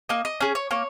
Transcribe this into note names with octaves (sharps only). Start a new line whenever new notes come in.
A#3 D#5
D#5
C#4 G#4
C#5
A#3 C#5